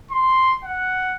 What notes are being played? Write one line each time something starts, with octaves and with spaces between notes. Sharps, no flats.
C6
F#5